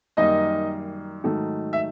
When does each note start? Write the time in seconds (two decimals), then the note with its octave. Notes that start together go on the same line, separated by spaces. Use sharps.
0.17 F#2 D#3 G3 A#3 D#4 D#5
1.24 G#2 D#3 F#3 A3
1.73 E5